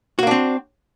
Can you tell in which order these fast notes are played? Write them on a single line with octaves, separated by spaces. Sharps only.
F#4 A#3 D4 C4